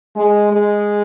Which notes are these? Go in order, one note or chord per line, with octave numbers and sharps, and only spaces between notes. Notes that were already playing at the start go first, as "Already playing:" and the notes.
G#3
G#3